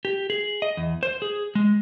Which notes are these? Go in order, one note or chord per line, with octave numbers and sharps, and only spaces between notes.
G4
G#4
D#5
E2
C5
G#4
G#3